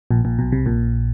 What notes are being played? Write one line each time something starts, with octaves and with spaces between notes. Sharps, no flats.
A#1 A#2
A#1 A#2
B1 B2
C2 C3
A#1 A#2